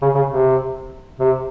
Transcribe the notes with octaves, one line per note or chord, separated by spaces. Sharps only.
C#3
C#3
C3
C3